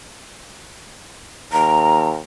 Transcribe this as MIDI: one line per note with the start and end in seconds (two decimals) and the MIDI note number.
1.52 2.19 39
1.52 2.10 82